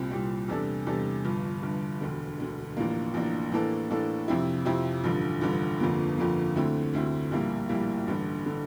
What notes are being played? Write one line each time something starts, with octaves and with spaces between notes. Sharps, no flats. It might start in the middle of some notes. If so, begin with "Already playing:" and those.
Already playing: C2 A#2 G3 C4
C2 A#2 G3 C4
E2 C3 G3 D4 A4
E2 C3 G3 D4 A4
G1 G2 F3
G1 G2 F3
E1 D2 D3
E1 D2 D3
A1 A2 F3 A#3 D4
A1 A2 F3 A#3 D4
A2 E3 A#3 D4 A4
A2 E3 A#3 D4 A4
F2 C3 F3 C4 E4
F2 C3 F3 C4 E4
A1 G2 D3 F3
A1 G2 D3 F3
G1 F2 D3 F3 A#3
G1 F2 D3 F3 A#3
D2 D3 A3 C4 E4
D2 D3 A3 C4 E4
A#1 A2 G3 A#3 E4
A#1 A2 G3 A#3 E4
A1 G2 D3
D3